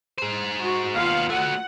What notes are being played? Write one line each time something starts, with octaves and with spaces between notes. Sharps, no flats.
G#4 C5
F#4
D#2 B3 F4 F5
A3 F#4 F#5